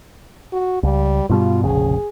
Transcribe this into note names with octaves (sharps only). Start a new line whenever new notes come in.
F#4
C#2 G3
G2 B2 G3 F4
F1 A#1 C#3 G#4